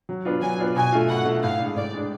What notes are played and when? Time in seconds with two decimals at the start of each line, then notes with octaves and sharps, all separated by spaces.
0.09 F#3
0.25 B3 D4 F4
0.42 F#3 G#5
0.59 B3 D4 F4
0.76 B2 G#5
0.92 A3 F4
1.09 B2 F#5
1.25 A3 F4
1.43 A2 F5
1.59 D4
1.64 G#3
1.76 A2 D5
1.94 G#3 D4